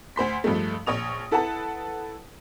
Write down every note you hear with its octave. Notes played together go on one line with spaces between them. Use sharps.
D2 C5 C6 B6
G2 F3 G#3 A3
A#1 C#5 D#6 F7
E4 A4 B4 F#5 A5